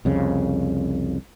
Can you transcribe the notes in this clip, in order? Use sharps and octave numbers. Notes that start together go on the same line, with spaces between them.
C2 F2 C#3